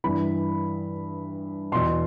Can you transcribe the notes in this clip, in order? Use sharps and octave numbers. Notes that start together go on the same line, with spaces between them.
G2 E3 B5
E2 B2 C6